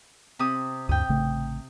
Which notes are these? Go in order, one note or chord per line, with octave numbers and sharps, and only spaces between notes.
C3 D#6
D2 G2 G5 D#6
A1 C#3 A3